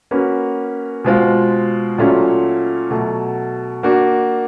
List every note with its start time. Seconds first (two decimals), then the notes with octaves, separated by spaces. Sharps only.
0.11 A#3 C#4 F#4 B4
1.04 B2 G#3 C4 F4
1.98 A#2 F#3 A3 C#4 F4
2.90 B2 F#3 A3
3.83 A#3 D4 F#4